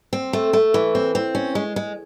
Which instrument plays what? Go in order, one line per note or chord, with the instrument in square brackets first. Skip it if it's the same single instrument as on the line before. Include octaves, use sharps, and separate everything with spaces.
[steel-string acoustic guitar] C4
A3
A3
E3
C4
C4
C#4
G#3
G#3